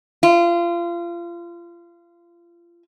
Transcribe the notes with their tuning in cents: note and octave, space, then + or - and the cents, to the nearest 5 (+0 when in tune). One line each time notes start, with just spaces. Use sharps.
F4 -30